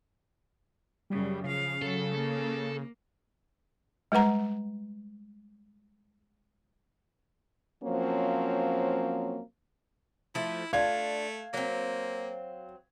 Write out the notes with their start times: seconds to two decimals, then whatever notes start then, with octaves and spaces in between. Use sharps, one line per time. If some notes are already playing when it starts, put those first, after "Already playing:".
1.10 F#2 C#3 G3
1.44 C#3 F3 F5
1.82 F#3 A4
2.14 A#3
4.12 G3 G#3 B4 F#5 A#5
7.83 F3 F#3 A#3 C4 C#4
10.35 F3 A3 E4
10.73 A3 D4 F4 F5 G#6
11.54 F#3 A#3 C4